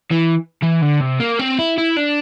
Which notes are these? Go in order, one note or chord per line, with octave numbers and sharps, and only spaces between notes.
E3
E3
D3
C3
A#3
C4
E4
E4
D4